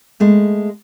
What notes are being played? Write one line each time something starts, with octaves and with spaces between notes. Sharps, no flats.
G#3 A3 B3